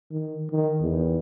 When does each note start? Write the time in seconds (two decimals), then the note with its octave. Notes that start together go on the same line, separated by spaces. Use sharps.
0.11 D#3
0.50 D#3
0.82 E2